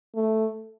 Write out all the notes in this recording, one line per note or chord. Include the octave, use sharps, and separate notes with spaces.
A3